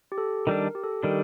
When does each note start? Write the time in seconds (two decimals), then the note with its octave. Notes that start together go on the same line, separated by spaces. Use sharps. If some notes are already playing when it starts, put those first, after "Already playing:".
0.12 G4
0.18 A4
0.47 D#3 G3 D4 A#4
0.75 G4
0.83 A4
0.91 G4
1.03 D#3 G3 D4 A#4